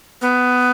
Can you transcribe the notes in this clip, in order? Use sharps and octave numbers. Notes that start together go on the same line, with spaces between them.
B3